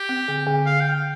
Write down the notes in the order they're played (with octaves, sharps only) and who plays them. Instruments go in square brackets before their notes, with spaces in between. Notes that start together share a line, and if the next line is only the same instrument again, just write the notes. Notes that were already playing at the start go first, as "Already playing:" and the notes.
Already playing: [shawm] G4
[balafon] C4
D3
D3
[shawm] F5
G5
G5